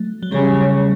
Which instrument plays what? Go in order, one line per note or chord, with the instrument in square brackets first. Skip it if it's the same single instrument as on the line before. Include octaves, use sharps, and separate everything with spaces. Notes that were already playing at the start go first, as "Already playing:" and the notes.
Already playing: [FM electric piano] F#3 A3
F#3
[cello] C#3 [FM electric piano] G3